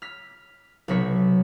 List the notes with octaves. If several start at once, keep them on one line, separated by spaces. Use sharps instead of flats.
F6 B6
B1 C3 F#3 C#6 B6